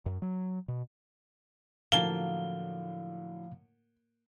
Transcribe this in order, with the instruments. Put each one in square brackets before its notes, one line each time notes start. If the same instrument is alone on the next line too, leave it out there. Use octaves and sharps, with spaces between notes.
[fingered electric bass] F#2
F#3
B2
[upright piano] A2 D3 F#3 [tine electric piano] F3 F5 [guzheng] A#3 A5 [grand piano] G7